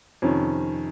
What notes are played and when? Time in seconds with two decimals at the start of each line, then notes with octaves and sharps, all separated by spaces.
0.22 F2 C3 D#3 C#4